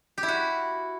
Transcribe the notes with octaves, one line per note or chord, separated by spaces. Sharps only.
G4
E4
F#4